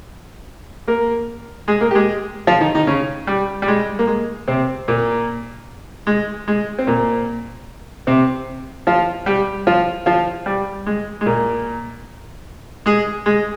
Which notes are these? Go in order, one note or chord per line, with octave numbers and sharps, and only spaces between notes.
A#3 A#4
G#3 G#4
A#3 A#4
G4
G#3 G#4
F3 F4
D#3 D#4
D#3 D#4
C#3 C#4
G3
G3
G#3
A#3
G#3
C3 C4
A#2 A#3
G#3
G#3
C4
A#2 A#3
C3 C4
F3 F4
G3 G4
F3 F4
F3 F4
G3
G#3
G#3
A#2 A#3
G#3 G#4
G#3 G#4